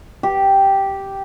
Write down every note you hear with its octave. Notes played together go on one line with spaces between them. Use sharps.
G4